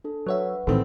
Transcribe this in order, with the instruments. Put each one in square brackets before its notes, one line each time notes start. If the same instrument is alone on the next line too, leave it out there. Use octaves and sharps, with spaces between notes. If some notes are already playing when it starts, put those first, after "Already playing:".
[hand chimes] D4 A4
[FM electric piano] F#3 C#5 E5 [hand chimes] B4 F#5
[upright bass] A2 [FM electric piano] D#3 E3 [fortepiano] A3 C4